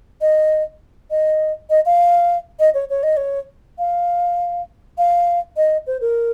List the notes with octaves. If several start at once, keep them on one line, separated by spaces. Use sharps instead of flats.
D#5
D#5
D#5
F5
D#5
C#5
C#5
D#5
C#5
F5
F5
D#5
C5
A#4